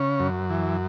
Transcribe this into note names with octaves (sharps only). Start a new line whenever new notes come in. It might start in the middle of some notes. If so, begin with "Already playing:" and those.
Already playing: C#3 C#4
F#2
E3